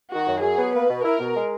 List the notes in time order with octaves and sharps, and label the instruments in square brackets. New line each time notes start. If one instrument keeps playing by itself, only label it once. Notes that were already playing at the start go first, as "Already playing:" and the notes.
[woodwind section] D#3 [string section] F#4
[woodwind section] F#2
[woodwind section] F#3 [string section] G#4
[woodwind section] B3
[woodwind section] A#3 [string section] B4
[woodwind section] B2
[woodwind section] E4 [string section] A#4
[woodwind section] B2
G#3